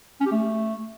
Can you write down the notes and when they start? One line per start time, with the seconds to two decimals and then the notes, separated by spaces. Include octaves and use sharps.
0.20 C#4
0.26 G4
0.32 A3